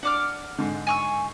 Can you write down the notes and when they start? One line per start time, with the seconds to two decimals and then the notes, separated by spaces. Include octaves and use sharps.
0.03 D4 F#5 D6 F6
0.58 G#2 D3
0.87 G#5 C#6 E6